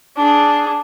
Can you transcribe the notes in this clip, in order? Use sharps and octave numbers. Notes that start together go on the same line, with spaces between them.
D4 G#4